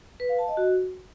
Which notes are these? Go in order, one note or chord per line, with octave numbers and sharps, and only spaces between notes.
B4
F5
A5
D#5
F#4